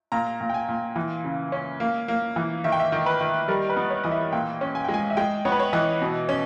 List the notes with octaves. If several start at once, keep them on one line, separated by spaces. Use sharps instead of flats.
A#2 A#5
A#2
G5
G#5
A#2
E3
C#3
C#4
A#3
A#3
E3
D#3 E5
G5
E5
D#3
B4
D#3
G3 A#4
B4
B3
C#5
E3 D#5
E5
A#2 G5
C#4
G#5
G#3 G5
G#5
E5
G#3 G5
B3 C#5
B4
C#5
E3 D#5
B2
C#4